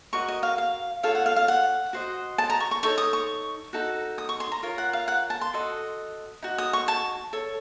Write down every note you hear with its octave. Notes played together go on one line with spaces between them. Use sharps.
F#4 A#4 D#5 C#6
D#5
F5
F5
F4 A4 C#5 F5
F#5
F5
F5
F#5
F#4 C5 D#5
A5
A#5
C#6
C#6
D#4 A4 C#5 C#6
D#6
C#6
D#4 F#4 A4
D#6
C#6
C6
A#5
F4 A#4 C#5
F#5
F5
F#5
A5
C6
F#4 A4 D#5
D#4 F#4
D#6
C#6
A5
A4 C#5